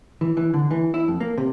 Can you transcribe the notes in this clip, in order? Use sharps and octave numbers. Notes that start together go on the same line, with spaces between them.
E3
E3
D3
E3
E4
F2
A#3
C3